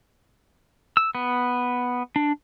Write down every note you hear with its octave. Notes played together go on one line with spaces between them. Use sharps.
E6
B3
D4